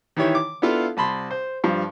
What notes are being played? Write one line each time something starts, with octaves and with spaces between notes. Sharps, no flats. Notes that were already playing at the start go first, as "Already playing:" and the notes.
D#3 E3 E4 G4 C#5
D6
B3 D4 E4 F4 A4 F5
C2 A5 B5 C6
C5
G2 F3